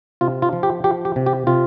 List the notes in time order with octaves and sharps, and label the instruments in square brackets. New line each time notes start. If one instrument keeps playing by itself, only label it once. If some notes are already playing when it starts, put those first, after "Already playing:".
[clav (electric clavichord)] C3 F4
F4
F3
G4
F3 G4
G4
C3
G4
C3 F4